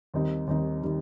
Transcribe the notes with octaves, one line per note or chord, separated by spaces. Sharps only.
D#2 D#3 G3 C4 D#4
D#2 D#3 G3 C4 D#4
D#3 G3 C4 D#4